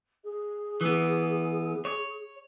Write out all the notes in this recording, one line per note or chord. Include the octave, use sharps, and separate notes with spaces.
G#4
E3 B3
C#5